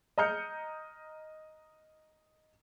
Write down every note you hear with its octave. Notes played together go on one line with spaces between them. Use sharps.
D#5 A#5 F6 G6 C#7